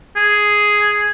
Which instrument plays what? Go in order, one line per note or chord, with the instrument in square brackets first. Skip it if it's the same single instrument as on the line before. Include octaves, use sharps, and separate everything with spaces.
[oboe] G#4